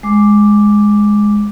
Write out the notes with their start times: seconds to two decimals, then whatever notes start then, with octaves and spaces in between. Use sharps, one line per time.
0.03 G#3 D6